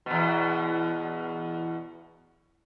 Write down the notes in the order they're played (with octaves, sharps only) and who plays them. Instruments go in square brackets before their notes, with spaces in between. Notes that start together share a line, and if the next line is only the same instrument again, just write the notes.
[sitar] E2 B2